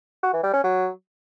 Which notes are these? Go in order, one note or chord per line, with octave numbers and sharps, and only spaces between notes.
F#4
E3
G3
C#4
F#3